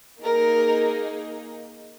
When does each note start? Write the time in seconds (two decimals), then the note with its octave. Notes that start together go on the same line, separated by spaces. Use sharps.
0.23 A#3 D#4 G#4 A#4